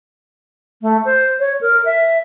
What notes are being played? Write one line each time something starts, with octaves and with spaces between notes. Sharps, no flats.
A3
C5
C#5
A#4
E5